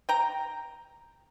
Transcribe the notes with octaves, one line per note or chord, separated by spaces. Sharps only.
G5 A#5